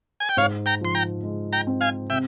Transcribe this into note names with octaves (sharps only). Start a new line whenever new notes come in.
G#5
G5
G#2 C#5 F5
G5 A#5
F3 C6
G5 A#5
G#3
G5 A#5
C4
F5 G#5
C3 E5 G5